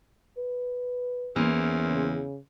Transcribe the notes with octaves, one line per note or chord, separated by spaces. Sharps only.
B4
E2 E3 A#3 C#4 C5
C#3